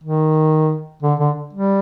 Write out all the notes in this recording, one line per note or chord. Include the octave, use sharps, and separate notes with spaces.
D#3
D3
D3
G3